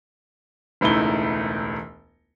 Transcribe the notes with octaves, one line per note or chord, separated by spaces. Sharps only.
E1 C#2 A3 D#4 E4 G7